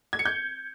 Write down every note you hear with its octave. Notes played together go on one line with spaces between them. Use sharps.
G#6
C#7
G6